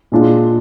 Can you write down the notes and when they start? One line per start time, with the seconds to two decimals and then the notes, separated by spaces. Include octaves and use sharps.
0.12 A#2 G#3 D4 F4